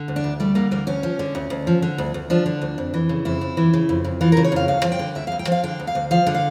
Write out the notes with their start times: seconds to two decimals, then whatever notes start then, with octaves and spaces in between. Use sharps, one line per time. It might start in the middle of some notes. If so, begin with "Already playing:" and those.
Already playing: D3
0.08 D2
0.16 D4
0.24 D2
0.40 G3 A3
0.55 D3 A#3
0.71 D2 A#3
0.87 D2 C#4
1.03 F3
1.19 D3
1.35 D2
1.50 D2
1.67 F3
1.82 D3
1.98 D2
2.14 D2
2.30 F3 D4
2.46 D3
2.62 D2
2.78 F2
2.94 E3
3.09 C#3
3.25 F2 E4
3.41 F2
3.57 E3
3.74 C#3
3.89 F2
4.05 F2
4.21 E3 F4
4.32 A#4
4.37 C#3
4.44 C#5
4.52 F2 F5
4.68 D2 F5
4.84 F3
4.92 G5
4.99 D3
5.15 D2 E5
5.27 F5
5.32 D2
5.39 G5
5.47 F3 F5
5.64 D3 G5
5.80 D2
5.87 F5
5.95 D2
6.11 F3 F5
6.27 D3
6.35 F5